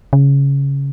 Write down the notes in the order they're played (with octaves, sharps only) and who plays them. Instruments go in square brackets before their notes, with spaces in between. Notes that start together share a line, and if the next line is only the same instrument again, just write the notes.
[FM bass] C#3